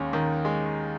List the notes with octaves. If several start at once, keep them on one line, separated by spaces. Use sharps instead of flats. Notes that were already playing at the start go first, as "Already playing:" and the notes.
Already playing: D#2 G#3 C#4
D#3
G#3